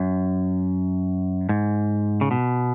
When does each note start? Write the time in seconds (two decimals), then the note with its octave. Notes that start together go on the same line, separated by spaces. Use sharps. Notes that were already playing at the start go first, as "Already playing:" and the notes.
Already playing: F#2
1.49 G#2
2.21 C#3
2.31 B2